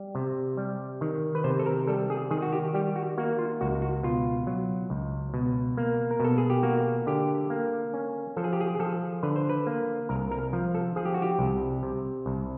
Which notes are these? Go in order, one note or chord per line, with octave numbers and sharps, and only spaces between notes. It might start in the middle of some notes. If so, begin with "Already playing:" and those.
Already playing: G3
C3
G3
D#3
B4
C3 C5
A4
A#4
G3 A4
G#4
D#3 G#4
F#4
G4
G3 G4
F#4
A#3 F#4
F4
C#2 F#4
F#4
B2 F4
F#3
C#2
B2
A#3
A#4
B2 A4
G#4
G4
A#3 F#4
D3 G4
A#3
C#4
F3 A4
G#4
G4
G#4
G#4
F3 A4
D3 B4
C5
B4
A#3
C2 A#4
A#4
F3
A4
F3 G#4
G4
F#4
G4
C2
C3
C2